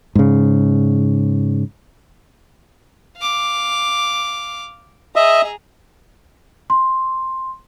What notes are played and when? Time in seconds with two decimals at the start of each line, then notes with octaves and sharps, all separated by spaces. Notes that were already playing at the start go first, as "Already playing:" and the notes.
0.15 G#2 C#3
3.17 F5 D6
5.16 G#4 D#5 E5 A#5
6.70 C6